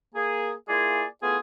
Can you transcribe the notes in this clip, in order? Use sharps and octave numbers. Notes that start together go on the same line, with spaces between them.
A#3 G#4
A#3 E4 F4 G#4 D5 G#5
A3 B3 E4 F4 G#4